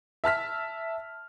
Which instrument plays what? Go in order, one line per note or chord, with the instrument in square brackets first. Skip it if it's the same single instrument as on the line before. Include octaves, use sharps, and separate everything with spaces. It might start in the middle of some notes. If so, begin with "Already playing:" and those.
[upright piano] E5 A5 F6 B6